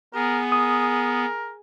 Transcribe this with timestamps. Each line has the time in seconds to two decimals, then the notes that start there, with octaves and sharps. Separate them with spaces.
0.14 B3 G#4 A#4
0.52 A#4 D#6